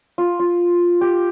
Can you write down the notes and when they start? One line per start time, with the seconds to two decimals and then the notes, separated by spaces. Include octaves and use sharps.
0.18 F4
0.40 F4
1.01 G4